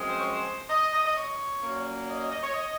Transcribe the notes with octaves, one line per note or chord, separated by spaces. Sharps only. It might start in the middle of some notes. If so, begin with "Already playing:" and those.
Already playing: F#2 F3 G#3 C4
C5
C#5
C5
D#5
D#5
D#5
C#5
A#2 F#3 A#3 C#4
D#5
D#5
D#5
C#5
D#5